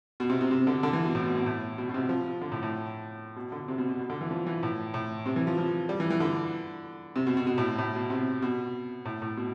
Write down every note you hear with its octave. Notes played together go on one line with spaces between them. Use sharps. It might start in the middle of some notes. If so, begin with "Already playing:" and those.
B2
C3
C3
C3
D3
D3
E3
B2
A2
B2
B2
A2
B2
B2
C3
F3
D3
A2
A2
B2
D3
C3
B2
B2
B2
D3
E3
F3
E3
A2
A2
C3
E3
F3
F3
G3
E3
E3
D3
C3
B2
B2
B2
A2
B2
A2
B2
C3
B2
A2
A2
B2